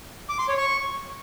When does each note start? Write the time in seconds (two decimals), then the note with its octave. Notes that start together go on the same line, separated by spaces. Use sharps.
0.29 D6
0.39 C6
0.48 C#5
0.58 C#6